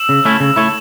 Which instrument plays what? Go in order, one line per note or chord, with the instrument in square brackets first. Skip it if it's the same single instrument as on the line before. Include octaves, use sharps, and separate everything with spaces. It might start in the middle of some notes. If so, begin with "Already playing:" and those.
Already playing: [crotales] E6 E7
[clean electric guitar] C#3
A3 C#4 E4
C#3
A3 E4 C#5